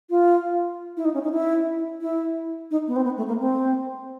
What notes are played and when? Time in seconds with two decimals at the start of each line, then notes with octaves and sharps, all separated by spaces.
0.10 F4
0.97 E4
1.05 D#4
1.14 C#4
1.23 D#4
1.32 E4
2.01 E4
2.71 D#4
2.88 B3
2.96 C4
3.05 B3
3.17 A3
3.28 A#3
3.40 C4